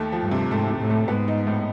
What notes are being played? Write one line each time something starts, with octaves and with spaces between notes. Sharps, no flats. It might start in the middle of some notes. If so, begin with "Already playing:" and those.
Already playing: D#2 A3
F3
G2
C3
G#2 A3
C3
A2
A3
G#2 B3
D#4
A2